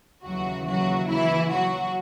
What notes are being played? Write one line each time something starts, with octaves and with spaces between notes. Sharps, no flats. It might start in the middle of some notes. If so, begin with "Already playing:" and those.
D#2 C#3 E3 F#3 F#4
F#3 F#4
E3 E4
F#3 F#4